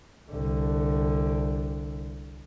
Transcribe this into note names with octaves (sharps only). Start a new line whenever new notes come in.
C2 D3